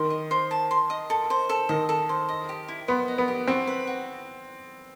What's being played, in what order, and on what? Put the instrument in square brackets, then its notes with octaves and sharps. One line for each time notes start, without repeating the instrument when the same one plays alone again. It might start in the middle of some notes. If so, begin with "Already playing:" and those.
Already playing: [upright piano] D#3 [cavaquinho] C6
[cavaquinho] D#5
C5
A5
C6
D#5
A4
C5
A4
[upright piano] D#3 [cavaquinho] D#5
[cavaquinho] A4
C5
D#5
G4
E4
[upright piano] B3 [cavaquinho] C5
[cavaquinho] D#5
[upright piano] B3
[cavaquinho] G4
[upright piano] C4 [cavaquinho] F#4
[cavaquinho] B4
F#4